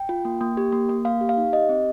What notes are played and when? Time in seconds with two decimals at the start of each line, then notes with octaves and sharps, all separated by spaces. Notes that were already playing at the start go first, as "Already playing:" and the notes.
Already playing: G5
0.09 F4
0.25 A#3
0.41 A#3
0.57 G4
0.72 A#3
0.89 A#3
1.05 A#3 F5
1.21 G4
1.29 F5
1.37 D#4
1.53 G4 D#5
1.69 C4